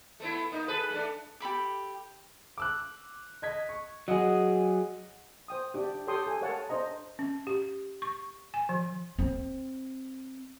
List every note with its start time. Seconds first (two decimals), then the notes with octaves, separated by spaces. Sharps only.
0.20 A3 B3 E4
0.52 A#3 D#4
0.68 G#4 A4 B4
0.91 A3 D4
1.40 G4 A4 B5 D6
2.58 D6 E6 F#6
3.42 D#5 G#6 B6
3.69 C#6
4.08 F#3 G#4 D#5 F#5 D#6
5.48 C5 G5 D#6
5.74 D4 G4
6.07 G4 A4 C#5 G5 C6 D#6
6.27 A4 G#5
6.41 A4 A#4 C#5 F5 F#5 A5
6.69 D4 C5 D#5 A#5
7.19 C#4
7.47 G4
8.02 C#6
8.54 G#5
8.69 F3
9.19 C4